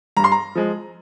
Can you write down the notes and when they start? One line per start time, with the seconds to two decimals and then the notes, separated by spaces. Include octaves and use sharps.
0.17 G2 A#5
0.24 C6
0.32 A#5
0.55 F3 G#3